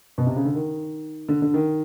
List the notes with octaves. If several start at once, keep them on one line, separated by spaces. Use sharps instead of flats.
B2
C3
C#3
D3
D#3
D3
D3
D#3